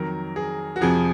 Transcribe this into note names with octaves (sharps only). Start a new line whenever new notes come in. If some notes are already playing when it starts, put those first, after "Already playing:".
Already playing: F2 D#3 F#3 A#4
G#4
F#4
F2 C3 F3 G#4